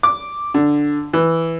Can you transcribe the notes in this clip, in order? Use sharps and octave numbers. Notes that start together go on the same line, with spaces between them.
D6
D3
E3